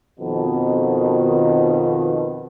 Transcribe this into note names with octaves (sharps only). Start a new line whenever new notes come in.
F2 B2 D#3